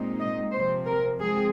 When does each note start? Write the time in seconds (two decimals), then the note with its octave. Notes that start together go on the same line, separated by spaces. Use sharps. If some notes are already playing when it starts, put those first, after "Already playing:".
Already playing: A#2 G#3 C4 D#4
0.21 D#5
0.53 C3 F3 C4 C5
0.86 A#4
1.20 F3 G#3 C4 G#4